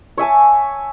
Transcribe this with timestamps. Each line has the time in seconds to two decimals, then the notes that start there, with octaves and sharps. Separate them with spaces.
0.17 C#5 E5 G#5 A5